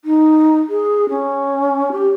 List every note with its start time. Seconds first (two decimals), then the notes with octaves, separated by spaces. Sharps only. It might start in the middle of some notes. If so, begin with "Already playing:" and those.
0.05 D#4
0.69 G#4
1.09 C#4
1.92 G4